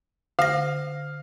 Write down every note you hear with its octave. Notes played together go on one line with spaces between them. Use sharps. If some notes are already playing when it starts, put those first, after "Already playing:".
D3 F5 A#6